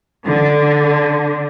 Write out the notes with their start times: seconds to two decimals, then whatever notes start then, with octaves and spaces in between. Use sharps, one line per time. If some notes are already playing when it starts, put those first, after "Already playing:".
0.24 D3